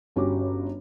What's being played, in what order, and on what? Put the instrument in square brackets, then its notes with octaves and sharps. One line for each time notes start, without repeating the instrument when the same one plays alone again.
[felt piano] G1 C#4 F#4 G4 D6